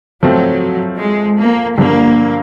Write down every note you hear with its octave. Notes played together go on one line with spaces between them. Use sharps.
F3 F#3 A3 C4
G#3
A#3
G2 D3 F3 A#3